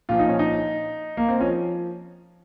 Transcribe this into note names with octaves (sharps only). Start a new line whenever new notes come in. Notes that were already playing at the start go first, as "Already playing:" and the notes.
A#2 F3 F4
D#4
C#4
D#4
A#3
C4
F3 C#4